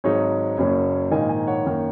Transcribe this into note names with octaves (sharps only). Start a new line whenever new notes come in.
G#1 G#2 F#3 D#4 G#4 C#5
F#1 F#2 F#3 A#3 C#4
A#1 G#2 D#3 A#3 D#4 D#5 G#5
D#5 G#5
C#5 F#5
F#2 D#3 A#3